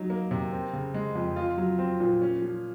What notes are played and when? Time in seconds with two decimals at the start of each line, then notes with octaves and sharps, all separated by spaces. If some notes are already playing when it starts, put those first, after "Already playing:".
Already playing: F#3 D#4
0.10 A#3
0.31 C3
0.52 C4
0.73 C#3
0.94 G#3
1.16 F2
1.36 F4
1.58 F#3
1.79 C4
2.00 A#2
2.22 C#4
2.42 F3